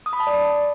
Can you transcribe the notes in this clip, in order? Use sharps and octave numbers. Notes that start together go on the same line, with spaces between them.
D#6
B5
A5
D5